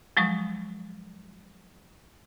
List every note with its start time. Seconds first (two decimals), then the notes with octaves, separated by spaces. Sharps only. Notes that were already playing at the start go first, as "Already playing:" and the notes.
0.17 F3 F#3 G#3 C#6 D#6